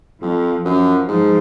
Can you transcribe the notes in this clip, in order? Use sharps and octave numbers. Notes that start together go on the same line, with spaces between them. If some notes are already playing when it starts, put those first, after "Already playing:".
F2 F3
F#2 F3
G#2 F3